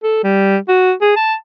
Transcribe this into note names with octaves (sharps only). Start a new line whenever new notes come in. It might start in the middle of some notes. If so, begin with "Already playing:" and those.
A4
G3
F#4
G#4
A5